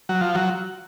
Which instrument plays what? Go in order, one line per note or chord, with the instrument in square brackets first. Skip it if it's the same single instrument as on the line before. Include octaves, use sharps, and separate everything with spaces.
[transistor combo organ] F#3
F3
F#3